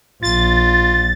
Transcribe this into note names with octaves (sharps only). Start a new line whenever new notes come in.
A#1 F4 A6